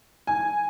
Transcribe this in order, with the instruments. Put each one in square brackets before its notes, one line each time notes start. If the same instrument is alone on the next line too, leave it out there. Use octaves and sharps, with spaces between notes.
[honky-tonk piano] G#5